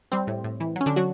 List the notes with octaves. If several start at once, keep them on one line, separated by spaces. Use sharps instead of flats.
G3 C4
A2
A2
E3
F#3 C#4
D3 D4
F#3 F#4